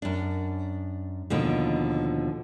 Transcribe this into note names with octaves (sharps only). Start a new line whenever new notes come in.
F#2 D4
D#2 B2 D3 F3